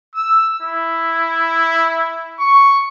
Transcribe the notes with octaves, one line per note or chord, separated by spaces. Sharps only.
E6
E4
C#6